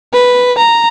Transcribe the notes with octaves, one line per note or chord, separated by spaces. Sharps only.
B4
A#5